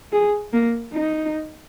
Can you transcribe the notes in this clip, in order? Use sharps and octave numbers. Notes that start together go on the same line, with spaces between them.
G#4
A#3
D#4